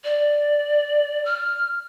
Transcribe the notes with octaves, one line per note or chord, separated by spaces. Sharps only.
D5
F6